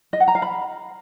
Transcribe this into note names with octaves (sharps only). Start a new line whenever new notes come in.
D#5
F#5
A#5
F5
B5